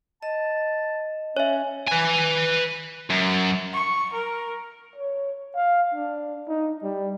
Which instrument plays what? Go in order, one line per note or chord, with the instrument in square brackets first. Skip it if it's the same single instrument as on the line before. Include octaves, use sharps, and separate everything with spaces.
[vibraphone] D#5 [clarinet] A5
[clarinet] C#4 [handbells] C#5 E5
[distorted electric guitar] B4 G#5
F#2
[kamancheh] C#6
A#4
[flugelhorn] C#5
F5
D4
D#4
G3